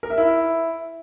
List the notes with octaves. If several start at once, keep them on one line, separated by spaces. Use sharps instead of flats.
A#4
E5
E4